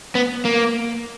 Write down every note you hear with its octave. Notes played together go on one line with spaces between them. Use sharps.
B3
A#3